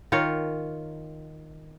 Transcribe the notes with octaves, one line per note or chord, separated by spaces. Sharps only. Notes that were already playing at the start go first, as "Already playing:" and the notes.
D#3 F4 A#4 C#5